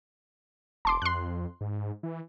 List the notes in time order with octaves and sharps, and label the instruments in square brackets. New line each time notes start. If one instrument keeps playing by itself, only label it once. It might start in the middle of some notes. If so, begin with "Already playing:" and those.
[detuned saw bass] E1 [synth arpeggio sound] A5 C6 D6
[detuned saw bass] F2 [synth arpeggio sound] C6 F#6
[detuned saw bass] G#2
E3